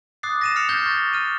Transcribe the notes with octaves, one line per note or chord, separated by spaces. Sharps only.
D6 D#6 F#6 A6 C7
A#6 D#7 E7
F6 C7 C#7 F7
F6 G6 A6 A#6 C7 G7
C#6 A6 A#6
F6 D#7